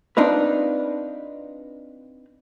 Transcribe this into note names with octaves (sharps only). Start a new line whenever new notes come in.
C4 D4 D#4 F4 B4